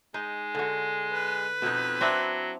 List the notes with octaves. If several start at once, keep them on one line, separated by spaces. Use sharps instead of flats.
G#3 D#4
D3 F#4
B4
F2 B2 D#4
F#3 C4 D4 E4